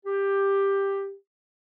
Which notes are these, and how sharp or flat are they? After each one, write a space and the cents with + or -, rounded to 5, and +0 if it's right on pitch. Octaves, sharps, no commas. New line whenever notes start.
G4 +10